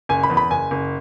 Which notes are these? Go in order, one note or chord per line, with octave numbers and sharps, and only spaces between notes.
F#1 G#5
B5
E2
B5
F#1 G#5
F#1